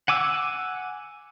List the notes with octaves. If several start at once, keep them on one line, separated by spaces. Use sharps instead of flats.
F#5 G#5 D6 E6